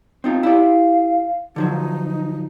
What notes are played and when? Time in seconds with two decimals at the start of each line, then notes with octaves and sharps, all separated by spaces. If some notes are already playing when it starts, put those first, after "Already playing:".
0.24 C4 D#4 F4
0.43 E4 G4 D5 F5
1.56 D3 F3 F#3 D#4